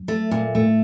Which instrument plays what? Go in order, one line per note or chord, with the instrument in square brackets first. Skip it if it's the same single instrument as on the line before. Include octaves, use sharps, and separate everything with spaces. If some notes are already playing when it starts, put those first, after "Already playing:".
Already playing: [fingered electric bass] F#2
[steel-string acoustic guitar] A3
A#2
[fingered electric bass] A2 [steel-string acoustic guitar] A3